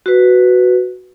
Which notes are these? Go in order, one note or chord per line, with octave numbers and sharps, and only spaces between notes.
F#4 B4